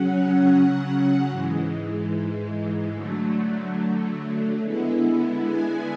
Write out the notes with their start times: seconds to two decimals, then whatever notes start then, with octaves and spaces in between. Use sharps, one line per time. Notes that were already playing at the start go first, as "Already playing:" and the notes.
Already playing: C#3 F#3 C#4 F#5
1.28 G#2 E3 G#3
2.94 D3 F#3 A3
4.61 D3 G#3 B3 E4
5.44 G#5